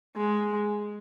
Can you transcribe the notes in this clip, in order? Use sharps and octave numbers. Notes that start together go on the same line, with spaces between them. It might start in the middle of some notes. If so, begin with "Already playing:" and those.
G#3